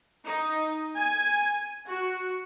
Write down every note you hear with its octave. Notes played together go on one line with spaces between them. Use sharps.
D#4
G#5
F#4